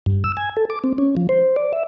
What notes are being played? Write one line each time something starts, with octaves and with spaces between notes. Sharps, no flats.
G2
E6
G#5
A4
D6
C4
C#4
F3
C5
D5
E5